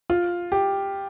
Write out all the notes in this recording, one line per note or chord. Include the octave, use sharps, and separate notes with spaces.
F4
G4